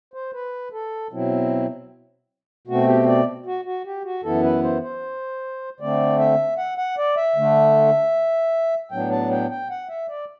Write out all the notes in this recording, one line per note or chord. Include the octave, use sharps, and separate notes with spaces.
C5
B4
A4
B2 F#3 C4 E4
B2 A3 C4 F#4
G4
D5
F#4
F#4
G4
F#4
F#2 E3 B3 E4 A4
B4
C5
C5
D3 A3 C4 D5
E5
F#5
F#5
D5
E5
D3 A3 D4
A2 F#3 B3 D4 G5
A5
G5
G5
F#5
E5
D5